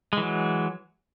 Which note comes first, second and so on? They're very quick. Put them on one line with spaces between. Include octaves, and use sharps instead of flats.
G#3 E3 F#3